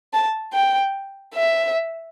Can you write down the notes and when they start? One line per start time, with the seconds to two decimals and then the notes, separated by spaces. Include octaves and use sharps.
0.13 A5
0.53 G5
1.35 E5